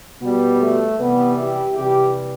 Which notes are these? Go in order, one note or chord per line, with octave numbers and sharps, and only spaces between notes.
B2 G3 B3
A3
C3 E3 G3 B3
E4 G4
C3 E3 G3 E4 G4